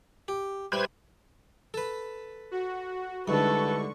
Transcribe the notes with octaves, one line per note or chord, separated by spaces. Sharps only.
G4
G3 E4 B4 C5 G#6
A4 B4
F#4
C2 G#2 D3 A4 B4 C#6